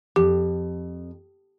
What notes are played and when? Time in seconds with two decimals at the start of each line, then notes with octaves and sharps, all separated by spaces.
0.16 F2 G4